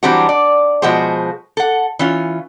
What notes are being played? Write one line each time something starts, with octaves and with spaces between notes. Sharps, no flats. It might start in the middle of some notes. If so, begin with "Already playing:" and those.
E3 F#3 G3 C4 D4 F#4
D5
B2 F3 G#3 F#4 G#4 C5
A4 F#5
E3 C#4 F4